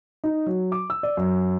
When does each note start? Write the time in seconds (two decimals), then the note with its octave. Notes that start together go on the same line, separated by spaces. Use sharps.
0.24 D#4
0.46 F#3
0.72 D6
0.90 E6
1.03 D5
1.17 F#2